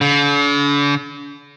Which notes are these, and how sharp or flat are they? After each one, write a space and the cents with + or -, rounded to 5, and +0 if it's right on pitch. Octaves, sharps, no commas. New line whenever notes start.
D3 -45